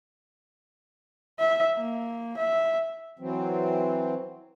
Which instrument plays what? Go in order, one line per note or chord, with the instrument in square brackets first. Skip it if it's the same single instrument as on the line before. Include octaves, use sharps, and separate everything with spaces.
[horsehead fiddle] E5
A#3
E5
[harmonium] E3 F#3 C4